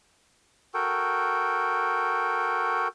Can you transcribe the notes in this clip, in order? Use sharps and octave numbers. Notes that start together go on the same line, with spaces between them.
F#4 A4 A#4 G5